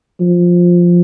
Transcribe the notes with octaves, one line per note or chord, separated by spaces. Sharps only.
F3